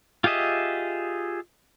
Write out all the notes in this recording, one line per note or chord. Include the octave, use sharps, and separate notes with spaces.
F4 G4 G#4 D#5 E5